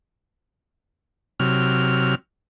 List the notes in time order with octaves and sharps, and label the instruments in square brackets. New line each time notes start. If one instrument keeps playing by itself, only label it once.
[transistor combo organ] C3 F#3 F6